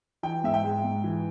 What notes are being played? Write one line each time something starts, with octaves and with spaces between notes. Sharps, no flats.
E3 G5
G#2 E5
G5
G#3
G#2
E3